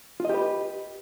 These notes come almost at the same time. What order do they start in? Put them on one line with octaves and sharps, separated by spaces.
F4 D#5 G4 B4